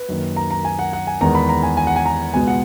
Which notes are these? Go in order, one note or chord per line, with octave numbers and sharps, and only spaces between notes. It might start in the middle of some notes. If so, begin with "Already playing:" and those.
Already playing: B4
F#2 D#3 A#3
A#5
A#5
G#5
F#5
F#5
G#5
E2 D#3 G#3 B3 A#5
B5
A#5
G#5
G#5
F#5
G#5
A#5
C#2 B2 G#3 B3 G#5
F#5